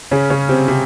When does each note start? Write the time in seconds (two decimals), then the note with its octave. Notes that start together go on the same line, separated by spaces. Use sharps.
0.11 C#3 C#4
0.30 C#3 C#4
0.49 C3 C4
0.68 C3 C4